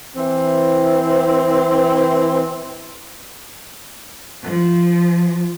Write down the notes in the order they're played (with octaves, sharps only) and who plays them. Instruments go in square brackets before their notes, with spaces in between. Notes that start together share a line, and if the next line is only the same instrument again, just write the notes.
[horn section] E3 C4
[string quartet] F3